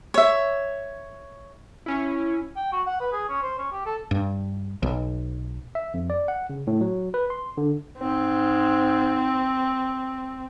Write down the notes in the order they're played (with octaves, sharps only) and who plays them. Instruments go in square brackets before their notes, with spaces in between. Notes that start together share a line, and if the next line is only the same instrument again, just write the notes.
[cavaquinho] C#5 E5
[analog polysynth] C#4 E4
[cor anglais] G5
F#4
F#5
B4
G#4
C#4
C5
C#4
G4
A4
[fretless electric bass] G2
B1
[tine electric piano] E5
F2
D5
F#5
C#3
A2
F#3
B4
C6
D3
[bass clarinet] G#2 [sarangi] C4